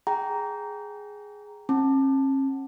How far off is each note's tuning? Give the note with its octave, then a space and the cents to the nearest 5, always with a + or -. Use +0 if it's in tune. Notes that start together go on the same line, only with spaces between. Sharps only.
G#4 +0 G5 -15 A#5 +0
C#4 -45 A5 +0